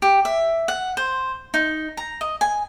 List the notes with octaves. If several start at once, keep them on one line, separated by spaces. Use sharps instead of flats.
G4
E5
F#5
C5
D#4
A#5
D#5
G#5